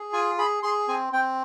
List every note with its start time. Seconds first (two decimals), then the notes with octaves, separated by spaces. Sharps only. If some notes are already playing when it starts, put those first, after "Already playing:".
Already playing: G#4
0.13 F4 G#5
0.38 G#4 B5
0.63 G#4 C6
0.88 C4 G#5
1.13 C4 G5